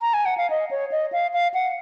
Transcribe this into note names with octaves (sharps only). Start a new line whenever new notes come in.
A#5
G#5
F#5
F5
D#5
C#5
D#5
F5
F5
F#5